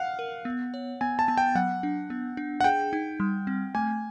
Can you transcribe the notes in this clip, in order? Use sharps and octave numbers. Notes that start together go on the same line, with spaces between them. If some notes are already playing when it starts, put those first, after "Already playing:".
Already playing: F5 F#5
A#4
B3
C#5
B3 G#5
A5
B3
G5
F#3 F#5
D4
B3
D4
F#5
G#4 G5
D#4
G3
C4
A3 G#5